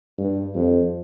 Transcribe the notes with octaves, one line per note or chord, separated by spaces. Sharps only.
G2
F2